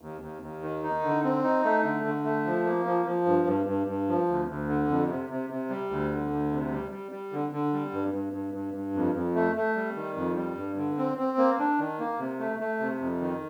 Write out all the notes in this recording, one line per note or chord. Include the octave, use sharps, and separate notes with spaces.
D#2
D#2
D#2
D#3
D#4
D3
C4
D#4
A3
D3
D3
A3
F3
A#3
F3
F3
G2
G2
G2
G2
F3
D2
D2
D3
F2
C3
C3
C3
G3
D2
D3
D2
C3
G3
G3
G3
D3
D3
G3
G2
G2
G2
G2
G2
F2
F2
A3
A3
G3
D#3
F2
G3
G2
D3
C4
C4
A#3
D4
D#3
A#3
C3
A3
A3
C3
F2
D#3